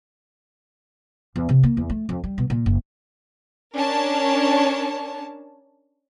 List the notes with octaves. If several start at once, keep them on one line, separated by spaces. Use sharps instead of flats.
E2
C3
A#3
E2
A3
F2
G3
B2
A#2
F#1
C#4 D4 A#4 C#5 A5